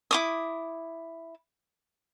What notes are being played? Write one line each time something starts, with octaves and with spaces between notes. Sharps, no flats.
E4 D6 D#6